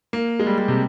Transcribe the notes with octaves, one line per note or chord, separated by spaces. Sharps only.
A#3
G#3
G3
G3
C3